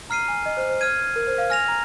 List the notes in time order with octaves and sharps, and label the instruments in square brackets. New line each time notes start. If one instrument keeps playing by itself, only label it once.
[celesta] A#5 [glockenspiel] F6 C7 D#7
[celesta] G#5
D#5
C5
C5
[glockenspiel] F6 G#6 D#7
[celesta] A#4
C5
F5
[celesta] G#5 [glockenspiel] F6 A#6 F7
[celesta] A#5